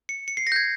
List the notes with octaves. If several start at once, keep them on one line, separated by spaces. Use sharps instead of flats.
C#7
C#7
C7
A#6
G6
G#6